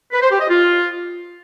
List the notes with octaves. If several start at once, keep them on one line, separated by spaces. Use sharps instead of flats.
B4
C5
G4
D#5
F4